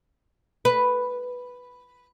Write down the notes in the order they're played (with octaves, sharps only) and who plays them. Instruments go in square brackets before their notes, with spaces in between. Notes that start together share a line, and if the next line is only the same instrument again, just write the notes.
[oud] B4